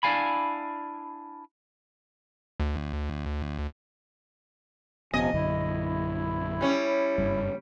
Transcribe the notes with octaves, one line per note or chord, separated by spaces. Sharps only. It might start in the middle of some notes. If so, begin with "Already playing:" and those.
D4 E4 D5 F5 G#5 B5
D2
D#1 C3 F3 B3 D#5 G#5
A#1 F#2 D3 E4
G3 C#4
F#1 G2